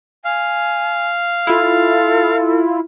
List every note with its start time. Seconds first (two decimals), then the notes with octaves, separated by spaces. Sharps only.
0.25 F5 G#5
1.47 E4 F4 A4